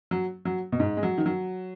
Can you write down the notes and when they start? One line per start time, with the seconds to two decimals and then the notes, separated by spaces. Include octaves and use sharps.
0.11 F#3
0.45 F#3
0.72 B2
0.80 G#2
0.97 G#3
1.03 F#3
1.18 D#3
1.26 F#3